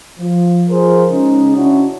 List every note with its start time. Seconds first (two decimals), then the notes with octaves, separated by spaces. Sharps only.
0.18 F3
0.69 F3 G#4 A#4 C5
1.10 C#3 G#3 C#4 D#4
1.56 C#4 D4 E4 F#4